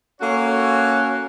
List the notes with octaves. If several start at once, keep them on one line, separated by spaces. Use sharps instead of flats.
A#3 C#4 F#4 A4 C#5